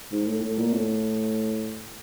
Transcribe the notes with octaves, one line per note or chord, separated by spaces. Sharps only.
G#2
A2
A2
A#2
A2